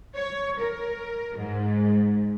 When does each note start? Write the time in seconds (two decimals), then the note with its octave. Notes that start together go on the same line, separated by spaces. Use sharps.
0.16 C#5
0.59 A#4
1.36 G#2